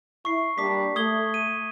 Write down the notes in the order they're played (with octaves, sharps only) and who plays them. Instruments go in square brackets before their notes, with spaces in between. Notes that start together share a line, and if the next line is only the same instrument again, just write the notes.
[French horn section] E4 [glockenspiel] C#6 C7
[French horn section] G3 A#3 D4 [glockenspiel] D6 B6
[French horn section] A3 [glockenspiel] D#6 G#6 G7
[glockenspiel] D#7